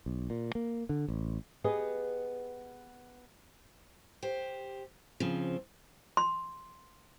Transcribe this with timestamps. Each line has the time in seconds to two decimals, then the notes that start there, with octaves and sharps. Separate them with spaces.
0.06 B1
0.30 A#2
0.55 A#3
0.89 D3
1.08 A1
1.64 B3 G4 G#4 B4 D#5
4.22 G4 C5
5.20 C#3 F3 C4
6.17 C6